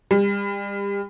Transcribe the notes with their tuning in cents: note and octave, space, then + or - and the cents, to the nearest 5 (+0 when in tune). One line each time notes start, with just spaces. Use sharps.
G3 +35